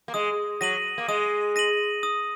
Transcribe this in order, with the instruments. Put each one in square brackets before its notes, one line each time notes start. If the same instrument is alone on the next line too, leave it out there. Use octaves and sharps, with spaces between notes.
[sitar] A#3
[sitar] G#3 [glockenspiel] D#6
[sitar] F#3 [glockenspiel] A#6 D#7 F#7
[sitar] A#3
[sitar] G#3 [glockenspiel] D#6
[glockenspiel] A#6 D#7 F#7
D#6